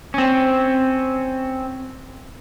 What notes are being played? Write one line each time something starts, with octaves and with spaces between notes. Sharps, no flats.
C4 C#4